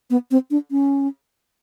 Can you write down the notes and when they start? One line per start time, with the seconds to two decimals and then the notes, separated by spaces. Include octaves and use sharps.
0.10 B3
0.31 C4
0.51 D4
0.71 C#4